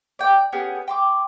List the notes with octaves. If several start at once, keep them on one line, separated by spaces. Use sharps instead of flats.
D5 G5
B3 C#4 G4 G#4
G5 C6 D6